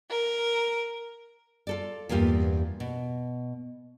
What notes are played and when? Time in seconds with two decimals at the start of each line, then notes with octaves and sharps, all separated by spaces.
0.10 A#4
1.67 F4 A4 D5
2.09 E2 G2 A#3 F4 G4
2.80 B2